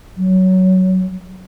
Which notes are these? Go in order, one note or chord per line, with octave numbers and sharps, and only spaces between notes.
F#3